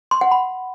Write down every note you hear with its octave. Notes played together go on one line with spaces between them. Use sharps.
C6
F#5
B5